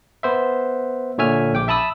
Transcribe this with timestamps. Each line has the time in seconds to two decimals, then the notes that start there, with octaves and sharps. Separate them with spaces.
0.23 B3 C5 E5
1.18 A#2 D3 C#5 E5 G#5 F6
1.53 A#1 G5 D6
1.68 E5 A5 B5 D#6 E6